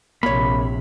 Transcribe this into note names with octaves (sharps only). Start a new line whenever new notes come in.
A#1 C3 A#3 C#5 B5